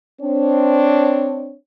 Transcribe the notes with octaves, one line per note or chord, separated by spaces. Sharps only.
C4 D4 C#5